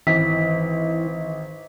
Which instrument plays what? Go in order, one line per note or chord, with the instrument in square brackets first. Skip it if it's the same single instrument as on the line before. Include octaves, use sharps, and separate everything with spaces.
[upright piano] G#1 [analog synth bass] E3 [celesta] B6